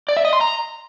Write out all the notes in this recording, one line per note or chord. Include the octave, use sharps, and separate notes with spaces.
D5
E5
D#5
C6
A#5